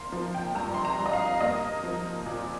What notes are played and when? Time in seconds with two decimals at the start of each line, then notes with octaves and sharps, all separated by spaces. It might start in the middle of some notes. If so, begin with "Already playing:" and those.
Already playing: A#3 C6
0.12 F3
0.34 G5
0.55 G2 A#5
0.74 C6
0.85 A#5
0.99 G2
1.06 D#5
1.13 F5
1.41 A#3 D#5
1.83 F3
2.26 A#2